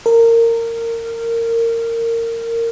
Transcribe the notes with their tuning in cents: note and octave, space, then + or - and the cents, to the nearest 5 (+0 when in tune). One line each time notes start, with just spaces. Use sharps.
A#4 -20